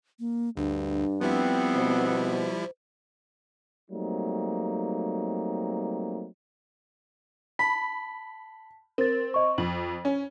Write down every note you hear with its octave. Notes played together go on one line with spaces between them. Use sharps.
A#3
D2 G2 D4
F3 G3 B3 C4 E4
B2 C5
F#3 G3 A3 A#3 C4 D#4
A5 B5 B6
C4 A#4 A6
D#5 C#6
F2 F#7
C#4